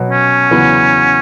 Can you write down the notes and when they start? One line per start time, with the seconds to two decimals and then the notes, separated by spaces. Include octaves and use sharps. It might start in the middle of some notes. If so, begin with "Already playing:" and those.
Already playing: B2 F#3 B3
0.10 C#4
0.51 E2 C#3 F#3 B3